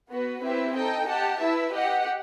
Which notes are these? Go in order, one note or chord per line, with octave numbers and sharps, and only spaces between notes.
B3 F#4 B4
C4 E4 G4 B4 E5
D#4 A4 D#5 G5
G4 D#5 F#5 A5
E4 B4 E5
G4 D#5 F#5